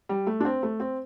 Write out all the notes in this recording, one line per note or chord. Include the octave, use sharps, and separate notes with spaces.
G3
A3
D4
C4
A3
C4